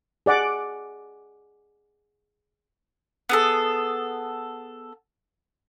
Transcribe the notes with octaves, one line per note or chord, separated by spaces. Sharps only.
G#4 D5 F#5 D6
B3 G#4 A4